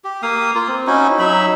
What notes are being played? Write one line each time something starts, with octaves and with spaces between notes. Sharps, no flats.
G4
A#3 F5 D#6
A#3 F4
C4
C#4 D#4 E4 F#4
F#3 D#4 E5 B5